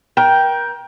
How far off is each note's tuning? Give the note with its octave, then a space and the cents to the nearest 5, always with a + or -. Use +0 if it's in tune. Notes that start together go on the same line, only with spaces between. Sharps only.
A#4 +30 G5 +0